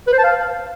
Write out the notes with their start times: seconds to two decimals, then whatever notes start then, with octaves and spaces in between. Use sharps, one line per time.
0.08 B4
0.13 C5
0.18 A5
0.24 F5